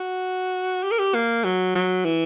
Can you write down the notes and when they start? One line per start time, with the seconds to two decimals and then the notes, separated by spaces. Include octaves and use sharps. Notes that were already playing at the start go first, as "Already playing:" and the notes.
Already playing: F#4
0.84 G4
0.91 A#4
0.99 G4
1.14 A#3
1.44 F#3
1.75 F#3
2.05 E3